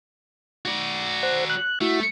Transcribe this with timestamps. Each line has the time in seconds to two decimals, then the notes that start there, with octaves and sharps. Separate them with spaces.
0.65 F#4 D5
1.23 C5 F#5
1.50 F#6
1.81 A3 E4 F#4